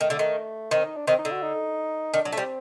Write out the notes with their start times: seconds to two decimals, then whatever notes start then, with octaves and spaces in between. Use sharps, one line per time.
0.01 D#3 A3
0.10 D3
0.19 D#3
0.71 D#3 C4
0.84 D#4
0.96 D4
1.07 D#3 C4
1.18 D#4
1.25 D3
1.31 F#4
1.43 D#4
2.14 D#3 D4
2.24 F#3 D4
2.32 A3
2.37 G3 C4